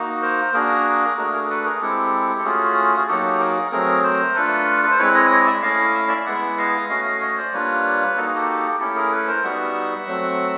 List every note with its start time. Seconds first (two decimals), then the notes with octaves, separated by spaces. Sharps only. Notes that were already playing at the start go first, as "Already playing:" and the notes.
Already playing: A#3 D#4 F#4
0.22 A#4 C5
0.54 A#3 D4 F#4 G#4 A#4
1.17 A3 D4 F#4 G#4 A#4
1.33 G#4 A#4
1.44 A#4
1.49 A4 B4
1.65 G#4 A#4
1.81 G#3 C4 E4 G4 A4
2.38 A4
2.44 A3 C#4 F4 F#4 G#4
2.97 G#4
3.08 F#3 A#3 D#4 F#4 G4 A4
3.40 G#4 A#4
3.72 F#3 A3 C4 G#4 A#4
4.03 A#4 C5
4.35 A3 D4 F4 A4 B4
4.83 B4
4.91 C5
4.99 G#3 C4 E4 B4 C#5
5.15 C#5 D#5
5.30 C#5 D#5
5.46 D5 E5
5.62 A3 C#4 E4 D#5 F5
5.94 E5
6.01 F5
6.08 D5 E5
6.26 G#3 B3 E4 E5 F#5
6.58 D#5 F5
6.89 A3 C#4 F#4 D#5 F5
7.05 D#5 F5
7.21 C#5 D#5
7.37 C5 D5
7.53 G3 A#3 D4 F4 B4 C#5
8.16 A#3 D#4 F#4 A4
8.26 G#4
8.36 G4 A4
8.80 A3 C#4 E4 G4 A4
8.96 G#4 A#4
9.12 A4 B4
9.28 A#4 C5
9.44 G3 B3 D#4 F#4 E5 F#5
10.07 F#3 A3 C4